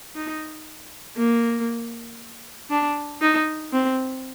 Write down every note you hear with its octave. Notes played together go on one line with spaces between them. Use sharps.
D#4
A#3
D4
D#4
C4